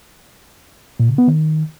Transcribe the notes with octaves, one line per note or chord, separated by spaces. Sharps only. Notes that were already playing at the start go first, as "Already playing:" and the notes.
A#2
C#3
B3
D#3